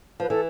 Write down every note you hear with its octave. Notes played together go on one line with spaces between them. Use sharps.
F3 B4
E3 A4